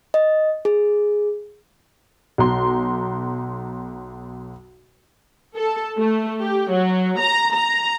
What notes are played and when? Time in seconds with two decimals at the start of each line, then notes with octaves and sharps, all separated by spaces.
0.14 D#5
0.65 G#4
2.38 B1 A#5 C6
5.57 A4
5.98 A3
6.42 G4
6.72 F#3
7.20 A#5
7.54 A#5